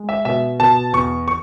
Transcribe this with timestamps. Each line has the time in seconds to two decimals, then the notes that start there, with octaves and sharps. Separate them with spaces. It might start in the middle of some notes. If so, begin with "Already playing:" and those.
Already playing: G#3
0.09 E5
0.25 B2 E5
0.60 B2 A5
0.93 E2 C#6
1.28 C#6